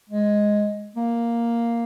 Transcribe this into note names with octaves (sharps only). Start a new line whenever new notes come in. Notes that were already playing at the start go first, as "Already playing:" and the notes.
G#3
A#3